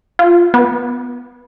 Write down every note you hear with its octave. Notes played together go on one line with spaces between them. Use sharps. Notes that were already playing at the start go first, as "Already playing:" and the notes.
F4
B3